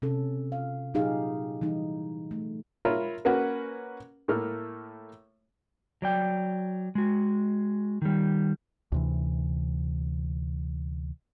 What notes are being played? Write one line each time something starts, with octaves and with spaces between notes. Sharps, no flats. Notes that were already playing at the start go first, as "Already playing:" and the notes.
C3 C#4 A4
F5
A#2 F#3 D#4 G4 G#4 F5
E3 G3 D#4
A3
F4 A#4 C#5 E5 B5
A#3 C#4 F#4 A#4 B4 F#5
A2 A3 A#3 F6
F#3 D5 G5
G#3 F#4
D#3 G3
D2 C3 E3